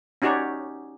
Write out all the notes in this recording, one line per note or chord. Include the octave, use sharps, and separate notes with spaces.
C#4 D#4 F#4 G4 C#5 D5